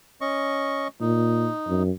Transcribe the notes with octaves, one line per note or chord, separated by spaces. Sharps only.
C#4 D#5 C#6
A#2 D#4
F#2